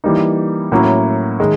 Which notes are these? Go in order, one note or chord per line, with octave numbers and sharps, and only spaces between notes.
E3 G3 A#3 D#4
A2 F#3 A#3 C#4 E4
D#3 G#3